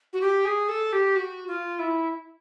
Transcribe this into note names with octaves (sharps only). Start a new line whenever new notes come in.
F#4
G4
G#4
A4
G4
F#4
F4
E4